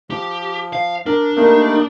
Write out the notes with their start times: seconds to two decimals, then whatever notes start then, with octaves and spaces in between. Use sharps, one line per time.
0.10 F3 G4
0.73 F5
1.06 D4 A#4
1.37 G3 A3 A#3 D#4 A#4